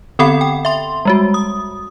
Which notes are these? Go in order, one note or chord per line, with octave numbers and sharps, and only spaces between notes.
D3 B3 C4 A4 F#5 B5
G5
E5 C6
G3 G#3 F#4
D#6